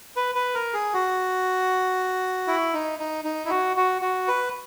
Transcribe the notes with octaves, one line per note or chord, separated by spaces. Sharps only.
B4
B4
A#4
G#4
F#4
E4
D#4
D#4
D#4
E4
F#4
F#4
F#4
B4